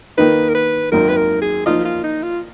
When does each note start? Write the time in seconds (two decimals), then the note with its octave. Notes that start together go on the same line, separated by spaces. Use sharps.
0.18 D#3 A#3 D#4 B4
0.49 A#4
0.55 B4
0.92 G#1 F#2 D#3 A#3 A#4
1.09 B4
1.17 A#4
1.42 G#4
1.66 F3 A#3 D#4 F4 A#4 D#5
1.85 F4
2.04 D#4
2.22 F4